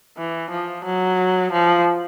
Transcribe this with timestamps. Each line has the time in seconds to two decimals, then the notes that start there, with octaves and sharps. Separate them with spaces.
0.17 E3
0.51 F3
0.85 F#3
1.52 F3